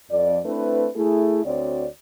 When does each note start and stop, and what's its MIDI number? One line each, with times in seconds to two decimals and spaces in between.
0.11 0.39 41
0.11 0.39 74
0.45 0.88 57
0.45 0.88 60
0.45 0.88 62
0.45 0.88 64
0.45 0.88 71
0.96 1.44 57
0.96 1.44 64
0.96 1.44 68
1.45 1.87 38
1.45 1.87 60
1.45 1.87 66
1.45 1.87 73
1.45 1.87 74